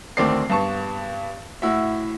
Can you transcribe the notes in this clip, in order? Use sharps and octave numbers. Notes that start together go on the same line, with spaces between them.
D2 D#3 C4 D5 D6 C7
G2 B3 A5 C#6
A2 E4 F#4 E5